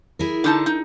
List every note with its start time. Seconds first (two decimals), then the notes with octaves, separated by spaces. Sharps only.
0.19 E4 G#4 A#4
0.44 D3 D#4 A5
0.66 D#4